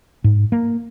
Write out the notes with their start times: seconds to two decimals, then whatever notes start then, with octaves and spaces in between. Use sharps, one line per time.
0.24 G#2
0.52 A#3